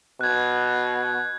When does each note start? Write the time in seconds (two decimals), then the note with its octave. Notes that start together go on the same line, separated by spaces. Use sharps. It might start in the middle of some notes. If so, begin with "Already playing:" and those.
0.21 B2 F#6 G#6